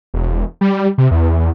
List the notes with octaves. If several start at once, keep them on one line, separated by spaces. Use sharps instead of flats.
E1
G3
C3
E2